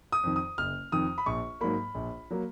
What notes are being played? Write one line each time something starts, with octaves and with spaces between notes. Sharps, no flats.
D#6
F2 D#3
D#6
F#1 F6
F2 D#3 D#6
B5
A#1 C#6
G#2 F#3 A#3 B5
A#1
F#3 A#3